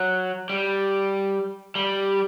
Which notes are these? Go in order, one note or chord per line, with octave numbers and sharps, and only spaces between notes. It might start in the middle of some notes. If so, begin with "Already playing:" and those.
Already playing: F#3
G3
G3